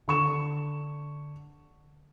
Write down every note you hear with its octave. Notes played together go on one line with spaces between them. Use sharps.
D3 C#6 E7